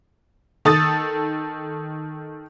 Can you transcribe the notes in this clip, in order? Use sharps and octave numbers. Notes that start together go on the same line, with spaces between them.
D#3 A4 D#6 A6